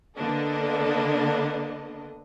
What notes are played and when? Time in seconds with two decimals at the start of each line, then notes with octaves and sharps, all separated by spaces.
0.16 D3 A#3 B3 D4 A4 D#5